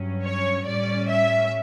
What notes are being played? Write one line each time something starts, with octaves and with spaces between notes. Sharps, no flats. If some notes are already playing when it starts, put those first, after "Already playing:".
Already playing: G2 F#3 C#4
C#5
A2 G3 C#4 D5
E5